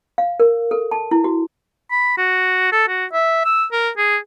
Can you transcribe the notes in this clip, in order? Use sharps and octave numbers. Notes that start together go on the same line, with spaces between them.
F5
A#4
A4
A5
E4
F#4
B5
F#4
A4
F#4
E5
E6
A#4
G#4